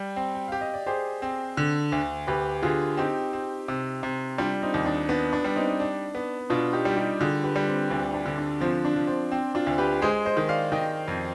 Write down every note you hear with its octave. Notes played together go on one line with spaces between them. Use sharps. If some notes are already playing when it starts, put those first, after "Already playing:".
Already playing: G3
C4
G5
G4 F5
D#5
D5
G4 G#4 C5
C4
D3
D2
D2 G4 B4
D3 F4 G#4
C4 D#4 G4
C4
C3
C3
G3 D4 F4
C4 D#4
D#2
D4
B3 D4
D4
G3
C4 D#4
D4
B3
B2 D4 F4
D#4 G4
G3
D#4 G4
D3 F4 G#4
G4 B4
G3
C4
D2 D4
D4
D3
D4
F3 C4
D4
F3
C4
C4
D4 F4
D2
G4 B4
G#3 G#4 C5
C5 D#5
D#3
D5 F5
D#3 D#5 G5
F2